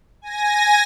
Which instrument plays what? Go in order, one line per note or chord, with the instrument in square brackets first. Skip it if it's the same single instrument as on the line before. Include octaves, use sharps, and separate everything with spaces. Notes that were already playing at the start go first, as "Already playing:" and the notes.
[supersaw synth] G#5 A#6